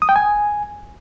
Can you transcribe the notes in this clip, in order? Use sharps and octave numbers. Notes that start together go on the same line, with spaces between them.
D#6
G5
G#5